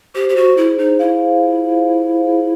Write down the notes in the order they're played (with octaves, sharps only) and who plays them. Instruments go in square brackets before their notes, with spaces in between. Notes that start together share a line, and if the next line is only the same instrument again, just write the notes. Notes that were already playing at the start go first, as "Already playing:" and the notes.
[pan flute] G4 [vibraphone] C5
[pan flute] G4
F#4
[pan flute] E4 [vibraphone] G#4
[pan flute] D#4
[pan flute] E4 [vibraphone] F5
[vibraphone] F4
C5
G#4